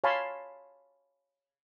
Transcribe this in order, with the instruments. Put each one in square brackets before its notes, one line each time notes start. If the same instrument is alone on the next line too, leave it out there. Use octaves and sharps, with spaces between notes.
[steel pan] C#5 F5 G#5 A5 B5 C6